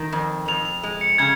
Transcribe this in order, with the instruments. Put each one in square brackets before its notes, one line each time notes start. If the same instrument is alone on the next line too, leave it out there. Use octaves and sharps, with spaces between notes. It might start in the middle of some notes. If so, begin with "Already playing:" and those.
Already playing: [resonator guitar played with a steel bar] D#3
F2
[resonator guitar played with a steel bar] F2 [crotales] F7
[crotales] F7
[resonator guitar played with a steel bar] G#3 [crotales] F7
[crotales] C#7
[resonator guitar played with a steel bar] C#3 [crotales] G#6